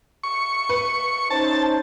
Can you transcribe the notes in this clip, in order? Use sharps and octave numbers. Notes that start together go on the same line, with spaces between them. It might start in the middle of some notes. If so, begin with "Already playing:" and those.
C#6
B4
C#4 D#4 C5 A5